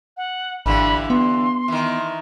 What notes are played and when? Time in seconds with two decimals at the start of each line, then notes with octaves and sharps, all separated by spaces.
0.17 F#5
0.66 G#1 G2 D3 E3 B5
1.10 B3 C6
1.68 D#3 E3